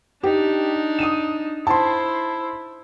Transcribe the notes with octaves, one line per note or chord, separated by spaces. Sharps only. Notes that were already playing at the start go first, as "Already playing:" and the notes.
D4 D#4 G4
D#6 D#7 E7
E4 C5 A5 C6